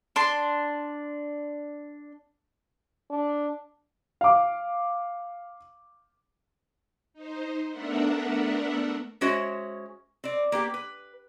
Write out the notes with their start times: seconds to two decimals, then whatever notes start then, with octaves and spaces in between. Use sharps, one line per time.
0.16 D4 C6
3.10 D4
4.21 F5 D6
7.14 D#4 C5
7.71 A3 B3 D4 A#4 E5 F#5
9.21 G#3 C#4 F#4 C5 C#5 E5
10.24 C4 D5
10.52 A#3 B3 G4
10.74 B4